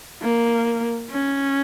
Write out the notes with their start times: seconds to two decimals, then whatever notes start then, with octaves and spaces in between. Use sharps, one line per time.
0.22 A#3
1.11 C#4